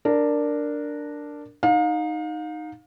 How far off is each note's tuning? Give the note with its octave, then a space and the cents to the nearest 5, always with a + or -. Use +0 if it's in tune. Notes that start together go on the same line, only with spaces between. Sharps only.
D4 +0 A#4 -10
D#4 -5 F5 +35